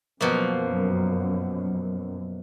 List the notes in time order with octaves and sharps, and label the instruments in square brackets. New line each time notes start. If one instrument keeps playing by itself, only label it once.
[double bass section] F#2 [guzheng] B2 F3 A#3